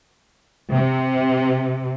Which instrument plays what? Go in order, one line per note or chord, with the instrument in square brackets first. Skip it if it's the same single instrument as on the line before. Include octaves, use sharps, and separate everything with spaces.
[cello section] C3